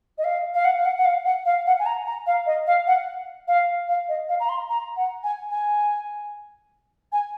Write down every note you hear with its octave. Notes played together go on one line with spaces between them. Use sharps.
D#5
F5
F5
F#5
F5
F#5
F#5
F5
F#5
F5
F#5
G#5
A#5
A#5
F5
D#5
F5
F#5
F5
F5
D#5
F5
A#5
C6
A#5
F#5
G#5
G#5
G#5